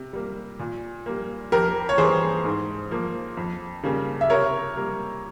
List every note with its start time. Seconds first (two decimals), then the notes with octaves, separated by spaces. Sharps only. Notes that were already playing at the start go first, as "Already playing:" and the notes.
Already playing: C3
0.13 G3 A#3
0.59 A#2
1.06 G3 A#3
1.52 F2 G4 A#4
1.89 C#5
1.98 E3 G3 A#3 G#4 C5
2.45 G#2
2.91 F3 A#3
3.37 F2
3.83 C#3 G3 A#3
4.21 E5
4.30 C3 A#4 C#5
4.76 G3 A#3